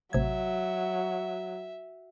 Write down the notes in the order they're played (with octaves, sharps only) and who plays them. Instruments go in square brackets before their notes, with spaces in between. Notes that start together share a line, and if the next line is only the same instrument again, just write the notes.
[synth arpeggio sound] A1 C3 G#6 [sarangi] F#3 [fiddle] E5